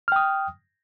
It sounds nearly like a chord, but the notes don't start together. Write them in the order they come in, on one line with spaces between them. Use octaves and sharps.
F6 G5 D#6